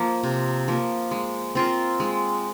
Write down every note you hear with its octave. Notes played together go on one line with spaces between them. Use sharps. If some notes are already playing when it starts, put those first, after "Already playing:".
Already playing: F3 A#3
C3
F3 A#3
G#3
C4 F4 A#4
G#3